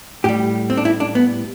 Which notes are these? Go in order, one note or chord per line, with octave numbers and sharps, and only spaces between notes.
A2 G3 G4
C4
D4
E4
D4
B3